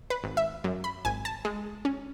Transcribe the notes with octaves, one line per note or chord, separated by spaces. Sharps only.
B4
G#1
E5
F#2
B5
G#1 G#5
A5
G#3
C#4